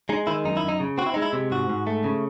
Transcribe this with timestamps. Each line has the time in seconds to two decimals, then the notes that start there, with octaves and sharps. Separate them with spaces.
0.09 G#3 D#4
0.27 D#3 E4
0.45 F#2 D#4
0.57 E4
0.63 F#2
0.68 D#4
0.80 C#3
0.98 C4 F#4
1.06 E4
1.14 G#3 D#4
1.22 E4
1.33 C3
1.51 G#2 F#4
1.69 G#2
1.87 A3
2.04 C#3